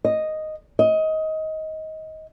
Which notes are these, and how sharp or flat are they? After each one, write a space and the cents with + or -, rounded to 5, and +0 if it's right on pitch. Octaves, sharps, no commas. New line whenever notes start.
D#5 +0
D#5 +20